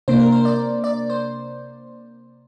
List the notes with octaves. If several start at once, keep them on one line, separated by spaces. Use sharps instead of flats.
C3 A#3 D4 C5
A#4
C5
D5
D5
C5